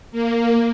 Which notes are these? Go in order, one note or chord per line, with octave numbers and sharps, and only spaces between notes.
A#3